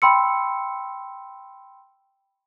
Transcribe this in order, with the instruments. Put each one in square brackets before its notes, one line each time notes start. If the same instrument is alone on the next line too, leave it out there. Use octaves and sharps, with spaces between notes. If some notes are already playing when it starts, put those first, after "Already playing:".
[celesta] G5 B5 C6 E6 C#7